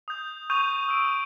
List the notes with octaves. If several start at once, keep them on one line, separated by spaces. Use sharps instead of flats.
D#6 G6
C#6 D#6 G6 D#7 F7
E6 D7